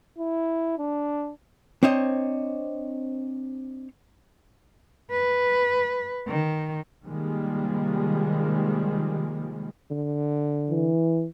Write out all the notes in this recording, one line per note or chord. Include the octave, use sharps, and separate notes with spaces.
E4
D4
C4 D4 C5 C#5 D#5
B4
D#3
C3 D#3 F3 G3 G#3 A#3
D3
E3